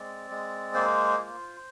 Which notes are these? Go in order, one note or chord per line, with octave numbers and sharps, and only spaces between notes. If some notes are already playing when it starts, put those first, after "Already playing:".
Already playing: G#3 C4 D5
G#3
A#3 C5
F4